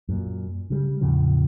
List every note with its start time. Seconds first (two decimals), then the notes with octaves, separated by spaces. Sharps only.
0.09 F#2 A#2
0.70 C#3 G3
1.01 E2 A2 C#3 F3